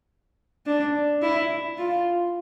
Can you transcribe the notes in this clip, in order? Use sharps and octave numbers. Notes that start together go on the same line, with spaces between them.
D4
E4
F4